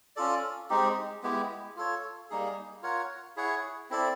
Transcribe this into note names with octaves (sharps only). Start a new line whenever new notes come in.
C#4 F4 A4 D5
G#3 C4 D#4 G4
G#3 B3 E4 G4
F4 A4 C#5
G3 A#3 D#4 G#4
F4 A#4 C#5 F#5
E4 G#4 C#5 F#5
C4 E4 A4 D5